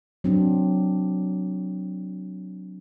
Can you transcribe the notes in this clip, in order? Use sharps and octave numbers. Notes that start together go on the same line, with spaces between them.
F#3 C4 D4